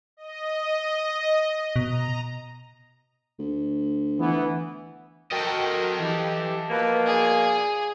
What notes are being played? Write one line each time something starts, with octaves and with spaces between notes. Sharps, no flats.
D#5
B2 A#5
D2
E3 B3
F#4 A4 A#4 D#5 G5
E3 G4
B2 F3 A#3 B4
G#4 D5